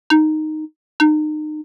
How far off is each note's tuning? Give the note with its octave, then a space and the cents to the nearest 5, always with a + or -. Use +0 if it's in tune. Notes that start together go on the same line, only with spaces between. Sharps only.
D#4 -5
D#4 -30